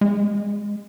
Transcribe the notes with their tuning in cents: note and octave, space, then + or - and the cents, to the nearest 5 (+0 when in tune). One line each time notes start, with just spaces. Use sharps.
G#3 -10